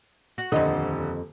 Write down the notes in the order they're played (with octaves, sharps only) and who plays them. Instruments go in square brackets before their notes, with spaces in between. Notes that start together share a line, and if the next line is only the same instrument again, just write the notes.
[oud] F#4
[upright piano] D#1 D3 [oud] F2 D#5